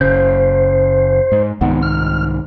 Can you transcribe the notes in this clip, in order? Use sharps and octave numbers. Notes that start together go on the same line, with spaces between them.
F#1 C#3 C5
G#2
C2 G#2 D#3 B3
F6